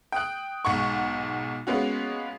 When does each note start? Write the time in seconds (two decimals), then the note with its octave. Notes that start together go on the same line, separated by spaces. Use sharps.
0.12 G5 D#6 F#6
0.65 B1 G#2 F#5 C#6
1.67 G#3 A#3 B3 C#4 F#4